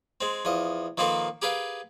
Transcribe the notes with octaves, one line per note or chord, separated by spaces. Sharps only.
G#3 C4
E2 F3 D#5
D#3 F3 A#3 C4 A4 B4
G4 G#4 A#4 B4 F5 G5